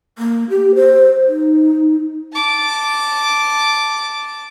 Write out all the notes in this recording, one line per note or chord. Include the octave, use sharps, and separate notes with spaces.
A#3
G4
C5
D#4
A5 D6